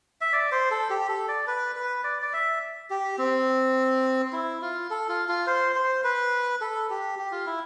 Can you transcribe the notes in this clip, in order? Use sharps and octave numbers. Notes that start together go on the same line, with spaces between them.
E5
D5
C5
A4
G4
A4
D5
B4
B4
D5
D5
E5
G4
C4
E4
F4
A4
F4
F4
C5
C5
B4
A4
G4
G4
F4
E4